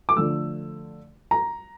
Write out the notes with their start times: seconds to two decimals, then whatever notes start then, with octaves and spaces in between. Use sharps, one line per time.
0.09 D6
0.16 D3 F3 A3 E6
1.31 A#5